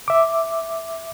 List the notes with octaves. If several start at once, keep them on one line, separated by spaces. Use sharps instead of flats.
E5 D6